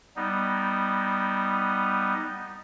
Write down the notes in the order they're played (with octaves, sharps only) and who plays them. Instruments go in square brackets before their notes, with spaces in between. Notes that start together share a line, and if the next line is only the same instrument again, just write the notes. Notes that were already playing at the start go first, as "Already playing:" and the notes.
[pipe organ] G3 B3 D#4